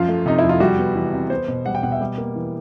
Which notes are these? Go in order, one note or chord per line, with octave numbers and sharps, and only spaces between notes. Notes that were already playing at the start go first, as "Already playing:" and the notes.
Already playing: F#2 F3 F4
A3
C3 D#4
F2 E4
F4
G3 F#4
B3
E3
C3
B3 C5
B2
G3 F#5
G5
B2 F#5
E5
G3
A#3
E3